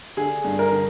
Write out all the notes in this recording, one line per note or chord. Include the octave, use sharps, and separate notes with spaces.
D3 G#4
G2
A#4
D3